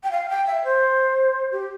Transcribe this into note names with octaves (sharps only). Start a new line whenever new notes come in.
G5
F5
G5
E5
C5
G4